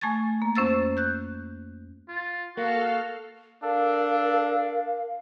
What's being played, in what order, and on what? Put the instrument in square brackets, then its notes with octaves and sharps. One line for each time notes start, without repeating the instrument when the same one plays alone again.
[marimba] A3 G#5 C#6 G#6 A6
A#3
F2 C#4 C5 E6 A6
F#6 G6
[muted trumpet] F4
[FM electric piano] A#3 [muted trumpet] F#4 [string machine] A4 F6 [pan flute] F5
[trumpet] D4 [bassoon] A4 [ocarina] A#4 [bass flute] F5